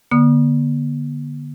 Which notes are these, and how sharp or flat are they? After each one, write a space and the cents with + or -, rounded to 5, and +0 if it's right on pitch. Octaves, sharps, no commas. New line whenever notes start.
D3 +0 B3 -45 D#6 -35